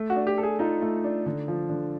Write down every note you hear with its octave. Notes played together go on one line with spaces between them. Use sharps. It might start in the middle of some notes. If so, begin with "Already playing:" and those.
Already playing: A3
F#4
D4
G4
A4
G#4
D#4 F4
A3
D4
D3
F3
D3